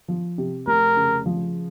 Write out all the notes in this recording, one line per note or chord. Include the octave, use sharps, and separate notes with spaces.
F3
C3
F1 A#4
C#3
F3